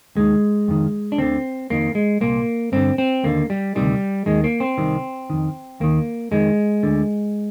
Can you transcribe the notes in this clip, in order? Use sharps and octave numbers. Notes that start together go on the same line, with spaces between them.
D#2 D#3 G#3
F2 D#3
D4
D2 D3 C4
F2 D#3 A#3
G#3
C2 A#2 A#3
G2 D3 C4
C4
D#2 D3 A#3
G3
D2 C3 D#3 G3
D#2 D#3 G#3
A#3
C4
C2 C3 D#3
F2 D#3
D#2 D#3 A#3
F2 D#3 G#3
D2 D3